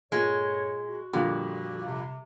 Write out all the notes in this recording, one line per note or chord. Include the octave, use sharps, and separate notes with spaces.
G2 A#2 G#3 A4 C#5
F#4
F2 A#2 D3 G3
C3